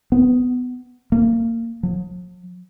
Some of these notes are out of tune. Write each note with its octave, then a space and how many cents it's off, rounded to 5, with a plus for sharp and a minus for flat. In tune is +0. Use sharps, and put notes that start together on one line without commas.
B3 +15
A#3 -25
F3 +45